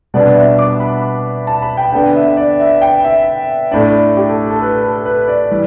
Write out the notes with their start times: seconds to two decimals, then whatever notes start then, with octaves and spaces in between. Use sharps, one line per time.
0.14 B2 G3 B3 D4 D5
0.35 E5
0.59 D6
0.80 B5
1.47 A5
1.62 B5
1.77 G5
1.92 D3 B3 D4 G5
2.15 E5
2.37 D5
2.60 E5
2.82 G5
3.04 E5
3.71 A2 A3 D4 D5
4.17 G4
4.28 A4
4.51 A4
4.62 B4
4.83 A4
5.05 B4
5.28 D5
5.51 E3 G3